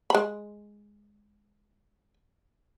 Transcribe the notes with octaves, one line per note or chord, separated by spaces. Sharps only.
G#3 B5